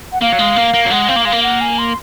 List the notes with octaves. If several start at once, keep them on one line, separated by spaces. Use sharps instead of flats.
F#5
A#3 F5
F#3
G#3
A#3
A#3
F#3
G#3 F#5
C4 F5
A#3
G#3 F5
A#3
F#5
G#5
C6